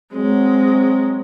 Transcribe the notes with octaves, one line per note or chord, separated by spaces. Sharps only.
F#3 G#3 C4